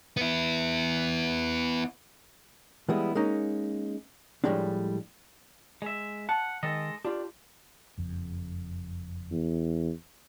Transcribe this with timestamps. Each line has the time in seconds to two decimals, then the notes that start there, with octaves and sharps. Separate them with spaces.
0.17 B3 E4
2.89 E3 G3 G#3 B3 E4
3.15 G#3 A#3 C#4 D#4
4.44 A2 F3 G3 G#3 A#3 D4
5.82 G#3 E5
6.29 F#5 A5
6.63 D#3 G#3 A4 D#5
7.05 D4 F4 G4
7.98 F#1 F2
9.31 E2